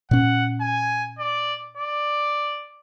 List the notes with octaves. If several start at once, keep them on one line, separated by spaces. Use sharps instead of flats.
A#2 C#4 F#5
G#5
D5
D5